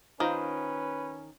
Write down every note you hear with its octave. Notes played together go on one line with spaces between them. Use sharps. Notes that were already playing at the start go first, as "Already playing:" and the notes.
D#3 C#4 F4 B4 C5 A#5